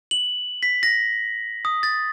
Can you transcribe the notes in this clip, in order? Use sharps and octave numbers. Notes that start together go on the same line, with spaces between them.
F#7
B6
A#6
D#6
A6